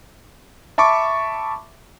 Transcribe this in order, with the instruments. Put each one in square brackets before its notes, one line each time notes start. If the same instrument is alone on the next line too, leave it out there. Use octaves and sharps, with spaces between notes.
[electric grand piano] E5 A5 B5 C#6 D6